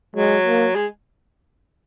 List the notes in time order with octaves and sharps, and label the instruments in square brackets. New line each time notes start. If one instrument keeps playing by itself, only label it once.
[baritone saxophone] F#3 [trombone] G#3
[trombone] A#3
[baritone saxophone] G#3